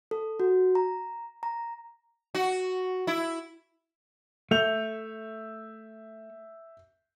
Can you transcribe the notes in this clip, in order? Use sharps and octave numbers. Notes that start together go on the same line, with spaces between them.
A4
F#4
A#5
A#5
F#4
E4
A3 E5 G6 F7